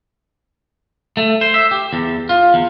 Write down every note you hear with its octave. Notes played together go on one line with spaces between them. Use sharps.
A3
C5
E5
G4
E2
F4
E2